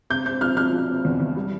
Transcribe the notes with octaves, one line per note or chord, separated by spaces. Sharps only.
C3 G6
C4 G6
F3 F6
F3 F6
F3
C4
E2
E2
G3